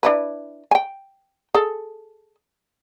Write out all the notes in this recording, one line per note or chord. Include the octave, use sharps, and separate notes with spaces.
D4 E4 B4
G5 G#5
G#4 A4